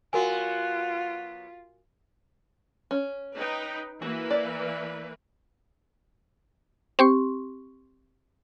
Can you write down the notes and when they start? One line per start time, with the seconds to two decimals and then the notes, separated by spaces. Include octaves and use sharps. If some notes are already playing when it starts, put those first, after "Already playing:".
0.13 F#3 B3 F4 F#4 A#4 G#5
2.91 C#4
3.35 D#4 B4 G5
4.02 E3 A#3 F#4 B4
4.31 D5
6.99 C4 G4 C6 C#6